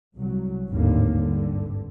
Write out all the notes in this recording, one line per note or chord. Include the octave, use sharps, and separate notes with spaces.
C2 F#3
G#1 D#2 A2 D3 A#3
G#1 G2 D3